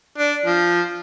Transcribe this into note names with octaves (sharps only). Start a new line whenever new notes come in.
D4
F3